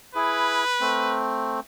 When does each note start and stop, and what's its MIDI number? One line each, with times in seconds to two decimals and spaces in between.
0.15 0.64 64
0.15 0.64 68
0.15 1.21 71
0.81 1.60 57
0.81 1.60 60